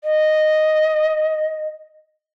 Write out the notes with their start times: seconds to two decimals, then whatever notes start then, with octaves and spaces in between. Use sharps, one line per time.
0.04 D#5